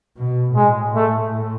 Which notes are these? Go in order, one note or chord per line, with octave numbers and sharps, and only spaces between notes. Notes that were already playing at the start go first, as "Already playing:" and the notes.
B2
A2 G#3
A3